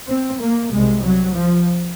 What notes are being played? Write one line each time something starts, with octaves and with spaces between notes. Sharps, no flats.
C4
A#3
C2 C3 G#3
F#3
F3